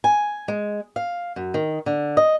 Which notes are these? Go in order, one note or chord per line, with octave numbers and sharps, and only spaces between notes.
G#5
G#3
F5
F#2
D#3
D3
D#5